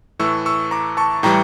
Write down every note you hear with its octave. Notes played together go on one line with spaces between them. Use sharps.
A2 E3 A3 C#6 E6
C#6 E6
A#5 D6
A5 C#6
A2 E3 G3 G5 A#5